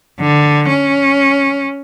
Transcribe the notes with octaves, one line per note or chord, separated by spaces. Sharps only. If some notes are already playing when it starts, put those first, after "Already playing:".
D3
C#4